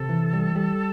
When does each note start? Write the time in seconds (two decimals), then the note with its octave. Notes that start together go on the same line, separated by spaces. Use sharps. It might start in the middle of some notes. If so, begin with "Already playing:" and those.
Already playing: C3 A4
0.09 E3
0.33 G3
0.55 G3